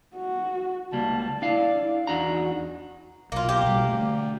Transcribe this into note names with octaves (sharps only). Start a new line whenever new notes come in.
F#4
C#2 G3 A#3 A5
D4 E4 D5 F5
E2 D4 D#4 F#4 A#5
B1 A#3 F4
A#3 G4
B2 G3
D3 A3